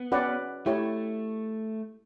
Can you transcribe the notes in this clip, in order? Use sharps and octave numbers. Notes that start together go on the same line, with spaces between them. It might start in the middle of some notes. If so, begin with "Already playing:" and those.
Already playing: B3
C#4 F#4 B4 D5 F#5
A3 E4 G4 C#5